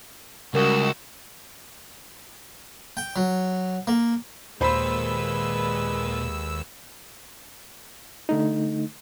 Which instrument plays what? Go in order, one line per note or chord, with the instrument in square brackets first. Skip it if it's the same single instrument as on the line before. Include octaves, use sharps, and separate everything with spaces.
[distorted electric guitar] C#2 [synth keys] G3 A#4 D#6 [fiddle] F#4 E6
[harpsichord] G5
F#3
A#3
[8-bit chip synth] D#2 E6 [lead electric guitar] A#2 [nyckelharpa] G#3 B4 [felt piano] C5 B5
[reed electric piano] D3 A3 D#4